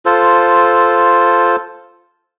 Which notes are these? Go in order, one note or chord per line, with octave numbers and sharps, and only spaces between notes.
F4 A4 C5